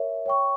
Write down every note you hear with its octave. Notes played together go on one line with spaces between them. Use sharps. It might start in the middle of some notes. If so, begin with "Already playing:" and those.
Already playing: A#4 C#5 E5
C#5 G5 C#6